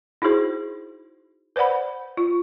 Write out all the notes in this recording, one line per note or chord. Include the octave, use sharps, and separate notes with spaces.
D#4 E4 F#4 G#4 C5
B4 C5 D5 F#5 B5
F4